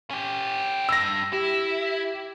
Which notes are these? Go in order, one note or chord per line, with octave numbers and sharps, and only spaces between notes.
C#4 G4
G2 E6 A#6
E4 G4